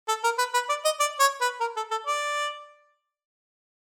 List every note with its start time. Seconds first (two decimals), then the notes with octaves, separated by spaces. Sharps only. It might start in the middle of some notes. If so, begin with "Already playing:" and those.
0.08 A4
0.24 A#4
0.38 B4
0.54 B4
0.69 D5
0.85 D#5
1.00 D5
1.20 C#5
1.41 B4
1.60 A#4
1.76 A4
1.91 A4
2.07 D5